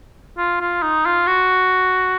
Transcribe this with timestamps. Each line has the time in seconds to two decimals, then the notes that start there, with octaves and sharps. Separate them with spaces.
0.38 F4
0.61 F4
0.83 D#4
1.05 F4
1.27 F#4